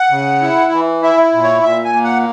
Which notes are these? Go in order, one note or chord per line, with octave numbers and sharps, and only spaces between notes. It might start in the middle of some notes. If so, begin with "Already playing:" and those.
Already playing: F#5
C#3
E4
E3
E4 E5
A#2
C#5
A#2 E5
G#5
A#3
F#5